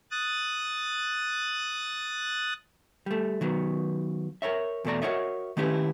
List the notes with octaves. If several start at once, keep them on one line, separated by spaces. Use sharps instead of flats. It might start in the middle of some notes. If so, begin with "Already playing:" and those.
D#6 F#6 A6
G3 A3
D#3 F#3 B3
A#4 B4 C#5 E5
E2 B2 A3 D5 A#5
F#4 G4 A#4 C#5 D#5 E5
D#3 A3 C#4 E4 G4 B4